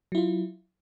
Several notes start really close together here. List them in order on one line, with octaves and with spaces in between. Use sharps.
F#3 E4 F4